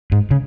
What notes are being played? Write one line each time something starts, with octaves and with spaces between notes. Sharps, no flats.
G#2
C#3